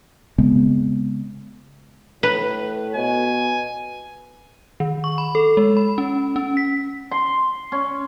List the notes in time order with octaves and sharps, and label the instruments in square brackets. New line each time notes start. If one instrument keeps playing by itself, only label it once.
[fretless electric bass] C#3 G#3 B3 C4
[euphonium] A2 [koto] B4
[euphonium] B2 [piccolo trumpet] G#5
[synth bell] D#3
C#6
B5
A4
G#3
B5
C#4
C#4
B6
[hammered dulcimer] C6
C#4